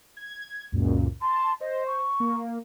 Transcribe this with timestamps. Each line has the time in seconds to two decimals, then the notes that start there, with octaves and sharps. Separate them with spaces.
0.17 G#6
0.72 C#2 F#2 A#2
1.22 A5 C6
1.61 C5 D#5
1.87 C#6
2.20 A#3